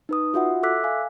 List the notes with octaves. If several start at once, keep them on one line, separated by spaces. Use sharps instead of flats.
D#4 B4 D#6
F4 F#4 E5 F#5
A4 E5 D6 E6 F#6 B6
F5 G#5